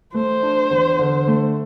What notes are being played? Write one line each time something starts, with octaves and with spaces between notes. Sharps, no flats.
A3 C5
D4
E2
D3
A3